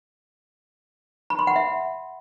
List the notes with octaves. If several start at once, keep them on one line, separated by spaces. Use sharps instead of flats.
B5
C6
F#5
E5